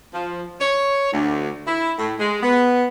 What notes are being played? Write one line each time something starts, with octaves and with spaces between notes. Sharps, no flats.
F3
C#5
D2
E4
A2
G#3
B3